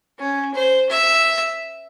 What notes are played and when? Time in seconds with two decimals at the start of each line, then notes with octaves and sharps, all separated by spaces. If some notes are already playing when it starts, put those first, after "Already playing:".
0.19 C#4
0.54 C5
0.90 E5